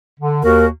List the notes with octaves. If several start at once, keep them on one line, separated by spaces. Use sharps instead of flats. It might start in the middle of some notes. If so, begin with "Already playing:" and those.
D3
D#2 F#4 A#4